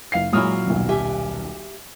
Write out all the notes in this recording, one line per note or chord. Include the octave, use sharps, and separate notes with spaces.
F#1 F5 C7
A#2 F#3 G#3 E4 D#6 F6
D#1 B1
G4 E5 G#5